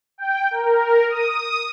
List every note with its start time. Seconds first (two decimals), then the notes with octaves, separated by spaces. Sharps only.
0.18 G5
0.51 A#4
1.09 D#6